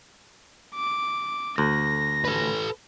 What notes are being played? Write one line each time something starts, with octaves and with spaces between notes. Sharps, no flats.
D6
D2 A#6
A4 B4